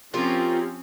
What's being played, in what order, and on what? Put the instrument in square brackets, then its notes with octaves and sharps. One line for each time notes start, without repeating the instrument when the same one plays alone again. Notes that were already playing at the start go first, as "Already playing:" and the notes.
[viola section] F3 C4 C#4 [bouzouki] F4 G4 A#4